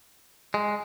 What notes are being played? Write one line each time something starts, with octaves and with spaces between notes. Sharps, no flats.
G#3